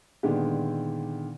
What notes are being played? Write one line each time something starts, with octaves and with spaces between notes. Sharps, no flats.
A#2 D3 D#3 G#3 B3 G4